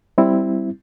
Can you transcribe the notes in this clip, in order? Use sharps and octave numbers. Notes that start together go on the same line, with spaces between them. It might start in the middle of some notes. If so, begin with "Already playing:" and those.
G3 C4 E4